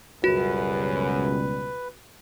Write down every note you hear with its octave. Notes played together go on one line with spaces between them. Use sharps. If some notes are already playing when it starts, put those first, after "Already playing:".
C#2 F#2 B2 G3 F#4 B4